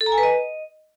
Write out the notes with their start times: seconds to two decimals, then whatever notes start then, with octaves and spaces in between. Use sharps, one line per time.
0.01 A4
0.06 A#5
0.12 G#5
0.18 B4
0.23 D#5